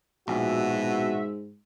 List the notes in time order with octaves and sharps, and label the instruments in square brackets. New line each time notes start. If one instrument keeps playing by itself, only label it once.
[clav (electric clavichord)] A#1 [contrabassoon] G#2 [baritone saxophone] B2 [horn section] F#4 E5